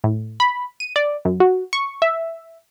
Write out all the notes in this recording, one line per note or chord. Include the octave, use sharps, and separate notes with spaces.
A2
B5
D#7
D5
F#2
F#4
C#6
E5